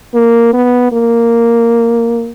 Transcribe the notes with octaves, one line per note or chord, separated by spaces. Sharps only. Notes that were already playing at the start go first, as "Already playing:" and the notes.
A#3
B3
A#3